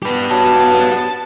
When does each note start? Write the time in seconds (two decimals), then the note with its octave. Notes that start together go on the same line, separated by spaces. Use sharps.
0.03 B3 G4 B4
0.30 F#3 A5